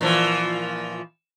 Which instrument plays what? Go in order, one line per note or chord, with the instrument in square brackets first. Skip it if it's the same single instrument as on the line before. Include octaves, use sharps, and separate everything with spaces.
[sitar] A#2 E3 F3